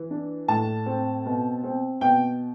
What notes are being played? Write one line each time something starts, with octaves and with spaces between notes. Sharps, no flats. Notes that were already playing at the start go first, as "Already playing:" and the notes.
Already playing: E3
D4
A2 A5
C4
B2
C4
B2 G5